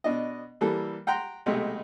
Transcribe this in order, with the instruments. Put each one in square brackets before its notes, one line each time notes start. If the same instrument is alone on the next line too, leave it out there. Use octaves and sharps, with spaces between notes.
[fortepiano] B2 D4 D#5
E3 G3 A#3 A4
F#5 G5 A#5 C6
B1 C3 G#3 A3